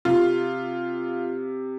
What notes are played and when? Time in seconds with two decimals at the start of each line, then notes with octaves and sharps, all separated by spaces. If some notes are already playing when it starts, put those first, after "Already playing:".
0.05 C3 F4